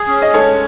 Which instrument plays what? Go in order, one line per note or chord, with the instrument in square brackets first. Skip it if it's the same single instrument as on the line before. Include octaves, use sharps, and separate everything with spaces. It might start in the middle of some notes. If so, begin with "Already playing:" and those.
Already playing: [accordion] G#4
C#4
[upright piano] D#5
[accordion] G#3 [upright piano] A4 C#5